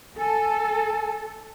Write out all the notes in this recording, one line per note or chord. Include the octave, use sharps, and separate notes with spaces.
A4 G#5